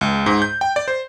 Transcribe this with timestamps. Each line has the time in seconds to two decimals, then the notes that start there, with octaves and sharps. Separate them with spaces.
0.01 C#2
0.26 G#2
0.42 G6
0.61 G5
0.76 D5
0.88 C5